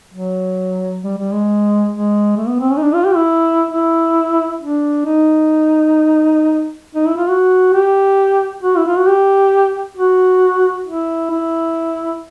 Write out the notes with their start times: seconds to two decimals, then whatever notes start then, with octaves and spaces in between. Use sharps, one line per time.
0.14 F#3
1.04 G3
1.18 G3
1.33 G#3
1.93 G#3
2.37 A3
2.48 B3
2.60 C4
2.71 C#4
2.77 D#4
2.82 D4
2.94 F4
3.05 G4
3.16 E4
3.71 E4
4.61 D4
5.06 D#4
6.95 D#4
7.07 E4
7.17 F4
7.28 F#4
7.74 G4
8.63 F#4
8.77 E4
8.87 F4
8.97 F#4
9.08 G4
9.97 F#4
10.87 E4
11.31 E4